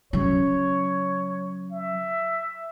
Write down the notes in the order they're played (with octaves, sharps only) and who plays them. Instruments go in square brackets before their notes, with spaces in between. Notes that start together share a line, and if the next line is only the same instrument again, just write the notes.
[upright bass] C#3 F#3 [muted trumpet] C#5
[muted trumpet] E5